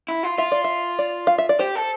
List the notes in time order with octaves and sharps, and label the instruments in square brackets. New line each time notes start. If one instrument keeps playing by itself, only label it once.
[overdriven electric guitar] E4
F4
[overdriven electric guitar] F4 [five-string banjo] E5
[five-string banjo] D5
E5
D5
F5
E5
D5
[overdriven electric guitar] G4 [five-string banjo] C5
[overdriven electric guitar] A4